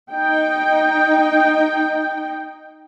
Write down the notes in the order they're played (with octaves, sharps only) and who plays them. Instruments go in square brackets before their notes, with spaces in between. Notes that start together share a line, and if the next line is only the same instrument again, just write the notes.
[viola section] D#4 G5